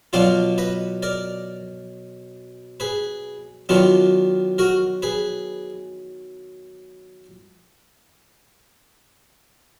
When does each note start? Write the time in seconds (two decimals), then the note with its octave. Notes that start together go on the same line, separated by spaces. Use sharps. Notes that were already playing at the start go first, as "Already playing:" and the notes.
0.13 B2 F#3 D4 F4 D5 F5
0.58 B4 D#5
1.03 A#4 D5
2.80 G#4 B4
3.69 D#3 F#3 B3 D4 F4
4.58 F#4 A#4
5.02 G#4 B4